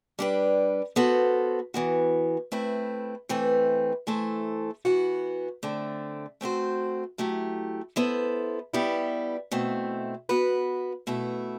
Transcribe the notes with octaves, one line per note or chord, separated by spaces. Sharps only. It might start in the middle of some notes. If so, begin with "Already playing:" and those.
G3 D4 G4 B4
B3 F#4 A4 C5
E3 B3 F#4
A3 C4 E4 B4
E3 A3 C4 E4 B4
E3 A3 E4 A4 C5
E3 B3 F#4
D3 A3 C4
A3 C4 F#4 C5
F#3 A3 E4 G4
B3 E4 A4 C5
G3 B3 E4 G4
B2 A3 C4 E4
B3 F#4 B4
B2 A3 E4